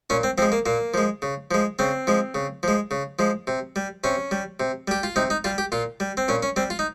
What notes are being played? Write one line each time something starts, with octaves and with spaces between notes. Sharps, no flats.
A#2 C#4
C4
F3 G#3 C4
A#3
A#2 A#3
F3 G#3
C#3
F3 G#3
C#3 C4
F3 G#3
C#3
F3 G#3
C#3
F3 G#3
C3
G3
C3 C#4
G3
C3
G3 G4
F4
C3 D#4
D#4
G3 F4
G4
A#2 F4
G3
C4
A#2 C#4
C#4
G3 C4
F4
D#4